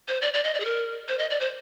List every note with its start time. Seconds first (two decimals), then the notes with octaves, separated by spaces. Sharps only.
0.08 C5
0.22 D5
0.34 D5
0.44 D#5
0.55 D5
0.60 G#4
0.65 A#4
1.08 C5
1.19 D#5
1.30 D5
1.40 C5